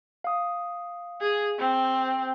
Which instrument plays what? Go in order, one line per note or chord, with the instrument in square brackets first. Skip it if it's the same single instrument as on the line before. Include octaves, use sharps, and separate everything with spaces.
[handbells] F5 D#6
[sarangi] G#4
C4